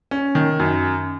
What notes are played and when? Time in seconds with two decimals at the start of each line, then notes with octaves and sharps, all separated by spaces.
0.11 C#4
0.35 D#3
0.60 F#2